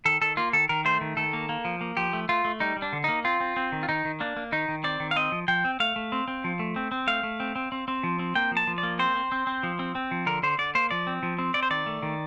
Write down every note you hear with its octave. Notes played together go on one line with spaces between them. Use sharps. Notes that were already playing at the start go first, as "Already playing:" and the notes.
D#3 A4
D#3 A4
A#3 F4
D#3 A4
D#3 A#4
A3 C5
D#3
D#3 A4
A#3
A#3
F3
A#3
F3 G4
A3
A3 F4
A3
G3 D#4
G3
D4
D3
A#3 D#4
C4 F4
C4
C4
D#3
F4
D#3 D#4
D#3
A#3 D4
A#3
D#3 D#4
D#3
C4 D5
D#3
F5
C4 D#5
F3
F3 G5
C4
A3 F5
A3
C4
C4
F3
A3
C4
C4
A3 F5
A3
C4
C4
C4
C4
F3
C4
A#3 G5
F3
A5
F3
D5
A#3
C4 C5
C4
C4
C4
F3
C4
C4
F3
D3 A#4
D3 C5
D3 D5
A#3 C5
F3 D5
C4
F3
C4
C4 D5
C5
D#3 D5
A3
D#3